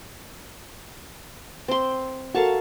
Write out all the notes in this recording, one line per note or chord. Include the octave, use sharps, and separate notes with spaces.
C4 C6
F#4 A4 A#4 F5 A5 C#6